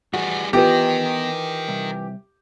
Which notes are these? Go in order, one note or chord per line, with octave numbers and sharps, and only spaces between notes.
E3 G3 F#4 G#4
E3 B3 F4 G4 A#4 B4 D#5
C2